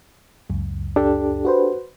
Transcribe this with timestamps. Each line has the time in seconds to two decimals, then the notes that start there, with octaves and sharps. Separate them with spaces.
0.50 C#2 F#2
0.96 D4 G4 A4
1.45 F#4 B4 C5